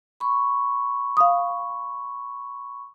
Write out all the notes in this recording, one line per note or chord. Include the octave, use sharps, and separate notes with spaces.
B5 C#6
F5 D#6